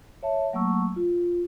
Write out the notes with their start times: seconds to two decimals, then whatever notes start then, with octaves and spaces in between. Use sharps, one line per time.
0.23 C#5 E5 A5
0.53 F#3 A3 A#3 A5 C#6 E6
0.96 F4